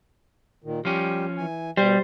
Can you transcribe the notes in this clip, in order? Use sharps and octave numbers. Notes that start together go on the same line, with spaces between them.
A#2 D#3
F3 G3 C#4 G4
E3 G#5
B2 G3 C5